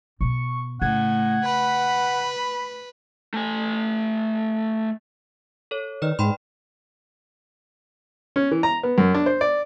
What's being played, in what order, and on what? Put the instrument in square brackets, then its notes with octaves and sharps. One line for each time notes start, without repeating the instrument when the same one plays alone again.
[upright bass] B2 B3 [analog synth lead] C#6
[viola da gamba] A2 [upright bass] C#3 [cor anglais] F#5 [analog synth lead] G#6
[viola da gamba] B4 [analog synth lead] B5
[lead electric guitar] A3 G#5
[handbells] A4 C#5
[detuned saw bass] D#3 [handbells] B4 D5 F6
[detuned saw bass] G#2 [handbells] G5 B5 C6
[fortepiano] C#4
E3
A#5
B3
F#2
D4
C5
D5